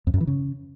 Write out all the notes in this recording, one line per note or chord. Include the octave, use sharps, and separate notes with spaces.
F2
F#2
E3
C#3